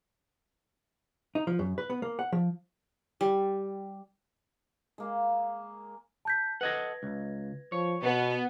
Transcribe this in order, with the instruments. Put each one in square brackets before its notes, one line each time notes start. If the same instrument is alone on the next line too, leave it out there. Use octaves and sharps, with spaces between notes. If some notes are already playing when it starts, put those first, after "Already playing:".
[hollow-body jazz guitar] D#4
F3
F#2
B4
B3
A#3
F#5
F3
[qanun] G3
[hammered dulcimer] G#3 A#3 F5
[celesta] A5 G6 B6
[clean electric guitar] A4 D#5 F#5 [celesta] B4 G#6 A#6
[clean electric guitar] C#2
[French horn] F3 [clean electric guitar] C#5
[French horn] B2 [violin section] B3